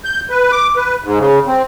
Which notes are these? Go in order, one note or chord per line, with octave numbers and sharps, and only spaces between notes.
G6
B4
D6
B4
G#2
C#3
C4